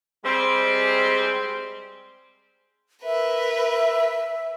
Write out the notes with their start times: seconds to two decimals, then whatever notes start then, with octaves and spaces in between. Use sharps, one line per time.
0.24 G3 G#3 C4
3.04 A#4 B4 E5